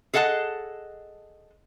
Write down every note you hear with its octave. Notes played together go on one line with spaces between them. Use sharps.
G#4 A4 D#5 F#5 A5